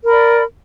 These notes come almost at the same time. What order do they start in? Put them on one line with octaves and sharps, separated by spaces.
A#4 B5 D5